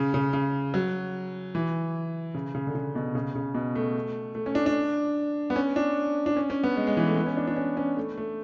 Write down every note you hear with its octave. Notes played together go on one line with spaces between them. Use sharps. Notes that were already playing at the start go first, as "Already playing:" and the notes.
Already playing: C#3
C#3
C#3
F#3
E3
C#3
C#3
D3
C#3
B2
C#3
C#3
B2
A3
A3
C#4
D4
D4
B3
C#4
D4
D4
C#4
C#4
B3
G#3
G#3
E3
A3
B3
C#4
D4
D4
C#4
C#4
A3
A3